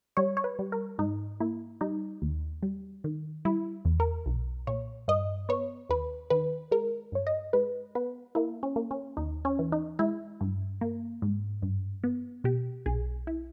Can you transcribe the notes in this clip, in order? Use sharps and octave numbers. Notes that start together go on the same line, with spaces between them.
G3 C#5
C#5
B4
G3
A#4
G#2 D#4
A#3 E4
G3 D#4
D#2
G3
D#3
G3 E4
E2
A#4
B1
A#2 C#5
G2 D#5
B3 C#5
D#2 B4
D#3 B4
G#3 A#4
G2 C#5
D#5
G#3 B4
B3 B4
A#3 E4
C#4
A#3
C#4
D#2 D#4
C#4
E3
D#4
G#3 E4
G2
A#3
G#2
G2
B3
B2 G4
B1 G#4
E4